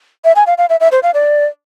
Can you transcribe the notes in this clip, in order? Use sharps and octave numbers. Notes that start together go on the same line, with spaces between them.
E5
G#5
F5
F5
E5
E5
C5
F5
D5